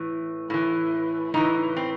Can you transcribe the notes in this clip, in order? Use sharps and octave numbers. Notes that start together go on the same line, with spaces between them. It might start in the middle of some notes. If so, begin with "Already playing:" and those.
Already playing: A2 E3
A2 E3
A2 E3 D#4
C4